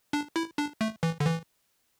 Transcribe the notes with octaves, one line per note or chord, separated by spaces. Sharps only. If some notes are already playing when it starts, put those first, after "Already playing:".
D4
E4
D4
A3
E3
D3
E3